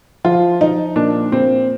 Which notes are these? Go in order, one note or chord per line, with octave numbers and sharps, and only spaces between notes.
F3 F4
F3 D#4
A#2 D4
A#2 C4